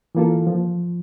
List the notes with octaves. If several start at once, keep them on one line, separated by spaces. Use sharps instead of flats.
E3 A#3 F4 A4
F3